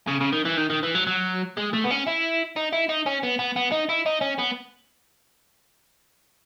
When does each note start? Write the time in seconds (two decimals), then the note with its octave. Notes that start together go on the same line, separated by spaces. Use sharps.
0.07 C#3
0.20 C#3
0.32 D#3
0.45 E3
0.57 D#3
0.70 D#3
0.83 E3
0.95 F#3
1.07 F#3
1.57 G#3
1.73 A3
1.84 B3
1.91 C#4
2.07 E4
2.56 D#4
2.73 E4
2.89 D#4
3.06 C#4
3.23 B3
3.39 B3
3.56 B3
3.72 D#4
3.89 E4
4.06 D#4
4.21 C#4
4.39 B3